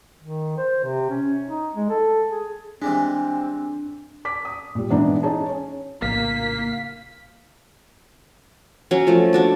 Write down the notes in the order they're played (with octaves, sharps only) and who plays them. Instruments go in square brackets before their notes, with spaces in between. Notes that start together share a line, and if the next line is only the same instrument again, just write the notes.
[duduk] D#3
C5
C3
C#4
D#4
G#3
A4
G#4
[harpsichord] E3 G3 G#3 [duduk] C4 [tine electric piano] D4
[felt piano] D6 B6
D#6
A#2 G3
G#2 E3 B3 D4 D#4
D#4 G#4 C#5 A5
C#4
[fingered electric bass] A#1 A2 C#3 [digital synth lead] A#3 [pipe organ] F5 F6 [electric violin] B6
[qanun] F#3 C#4
F3 A3
D4 F#4 D5